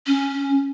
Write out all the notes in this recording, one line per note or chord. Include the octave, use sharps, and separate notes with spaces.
C#4